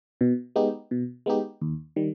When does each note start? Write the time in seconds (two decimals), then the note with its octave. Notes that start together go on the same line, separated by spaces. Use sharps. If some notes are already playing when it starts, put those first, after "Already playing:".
0.21 B2
0.56 G#3 B3 D#4 G4
0.91 B2
1.26 G#3 B3 D#4 G4
1.62 D#2
1.96 D#3 G3